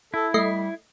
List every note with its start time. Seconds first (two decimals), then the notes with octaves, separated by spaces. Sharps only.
0.14 E4 A4
0.34 G3 A3 D#5 C7